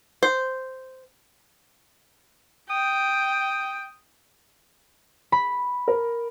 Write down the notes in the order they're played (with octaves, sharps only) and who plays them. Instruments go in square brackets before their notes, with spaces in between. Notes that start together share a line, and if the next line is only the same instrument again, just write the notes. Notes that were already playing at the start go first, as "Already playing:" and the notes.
[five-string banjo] C5
[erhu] G5 [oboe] D#6
[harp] B5
[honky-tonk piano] A#4